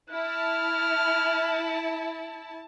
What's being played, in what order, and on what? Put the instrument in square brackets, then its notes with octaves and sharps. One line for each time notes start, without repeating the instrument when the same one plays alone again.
[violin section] E4 A5 [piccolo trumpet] F6